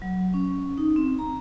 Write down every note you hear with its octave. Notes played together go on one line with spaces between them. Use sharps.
F#3
C#4
D#4
C4
A#5